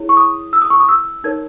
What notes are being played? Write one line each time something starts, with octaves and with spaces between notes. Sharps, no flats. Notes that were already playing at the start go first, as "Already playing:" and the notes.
Already playing: E4 G#4 C#5
C#6
D#6
E6
D#6
C#6
D#6
E6
D#4 A#4 C#5 G#6